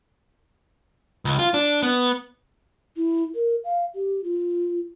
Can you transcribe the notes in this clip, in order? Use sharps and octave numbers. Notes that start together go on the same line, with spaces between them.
C#2
F4
D4
B3
E4
A#4
F5
G4
F4